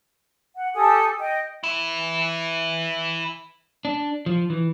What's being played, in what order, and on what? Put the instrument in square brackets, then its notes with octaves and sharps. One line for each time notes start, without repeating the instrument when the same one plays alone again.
[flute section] F#5
G4 A4 G#5 D#6
D#5 G5
[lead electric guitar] E3 E4
[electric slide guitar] D4
F3
E3